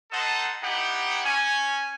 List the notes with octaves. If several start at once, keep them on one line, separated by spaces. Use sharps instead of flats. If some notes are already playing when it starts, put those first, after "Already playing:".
D#4 A4 C5 D#5 F#5 A5
B3 D#4 E4 G4 F#5 G5
C#4 G#5